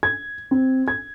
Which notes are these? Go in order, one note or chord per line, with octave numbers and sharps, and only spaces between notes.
G#6
C4
G#6